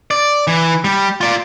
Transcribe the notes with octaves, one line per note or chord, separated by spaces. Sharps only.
D5
E3
G3
F4 D5